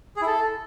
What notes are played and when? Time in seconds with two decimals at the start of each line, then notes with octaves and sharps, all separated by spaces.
0.17 G#4
0.22 E4
0.27 A4